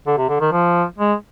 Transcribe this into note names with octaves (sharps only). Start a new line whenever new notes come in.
D3
C3
D3
D#3
F3
G#3